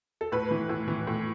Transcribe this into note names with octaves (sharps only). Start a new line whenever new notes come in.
A4
A2 B4
E3
A2
E3
A2